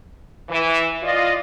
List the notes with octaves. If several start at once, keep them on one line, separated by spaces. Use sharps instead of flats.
E3
F4 D5 D#5